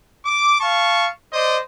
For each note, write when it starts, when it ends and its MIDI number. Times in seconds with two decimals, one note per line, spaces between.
0.25 0.58 86
0.60 1.07 77
0.60 1.07 81
0.60 1.07 85
1.32 1.56 72
1.32 1.56 74
1.32 1.56 75